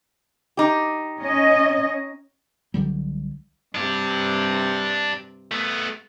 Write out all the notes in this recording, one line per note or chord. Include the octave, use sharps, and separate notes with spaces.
D#4 G4
C#4 D#5
C2 D3 F#3 G3
G2 C3 D4 G4
A3 B3